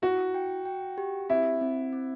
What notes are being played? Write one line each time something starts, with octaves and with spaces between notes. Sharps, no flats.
E4 F#4
G5
G5
G4
C4 E4
C4
C4